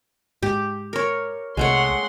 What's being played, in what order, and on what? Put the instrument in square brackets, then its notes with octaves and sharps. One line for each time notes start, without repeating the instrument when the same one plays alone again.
[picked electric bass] G#2 [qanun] G4
[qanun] A#4 C#5
[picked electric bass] C2 [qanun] G#3 A3 C#5 [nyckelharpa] F#5 C6